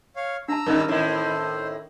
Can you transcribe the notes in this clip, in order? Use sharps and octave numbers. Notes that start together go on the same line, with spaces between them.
C#5 F5
D4 A5 A#5 E6
G2 D#3 G3 C#4 D#4 A#4
A2 D#3 E4 C5